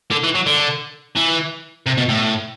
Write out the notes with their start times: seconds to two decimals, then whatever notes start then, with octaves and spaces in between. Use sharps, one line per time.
0.11 D3
0.23 E3
0.35 F#3
0.46 D3
1.16 E3
1.86 C3
1.97 B2
2.09 A2